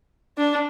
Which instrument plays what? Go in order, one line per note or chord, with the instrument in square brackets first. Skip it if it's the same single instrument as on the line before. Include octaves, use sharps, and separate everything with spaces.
[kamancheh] D4